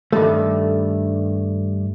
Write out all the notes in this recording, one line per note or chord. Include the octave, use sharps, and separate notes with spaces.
G2 D#3 G3 A3